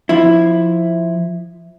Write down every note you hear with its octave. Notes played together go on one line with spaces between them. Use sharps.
F3 E4